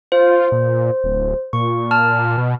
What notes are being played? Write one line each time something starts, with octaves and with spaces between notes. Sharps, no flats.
F4 C5
A#2
D1
A#2 C#6
A5 F6
B2